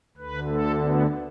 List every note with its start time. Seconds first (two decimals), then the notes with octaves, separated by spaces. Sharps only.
0.17 D2 D3 B4
0.50 A4
0.81 B3